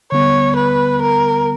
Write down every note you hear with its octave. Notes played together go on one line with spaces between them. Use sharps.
D3 G3 B3 C#5
B4
A#4